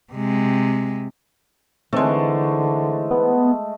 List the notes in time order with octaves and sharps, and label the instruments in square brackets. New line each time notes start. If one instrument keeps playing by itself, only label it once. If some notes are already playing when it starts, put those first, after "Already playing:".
[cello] C3 G#3
[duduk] D3 [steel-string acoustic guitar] E3 C4 D#4 [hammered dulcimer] G#3 A3
[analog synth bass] B3